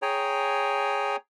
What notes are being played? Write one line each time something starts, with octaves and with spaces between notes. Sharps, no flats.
G#4 C#5 G5 G#5 A#5